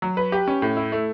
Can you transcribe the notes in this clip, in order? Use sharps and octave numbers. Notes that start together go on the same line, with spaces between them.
F#3
B4
G4
C#4
A2
E4
A3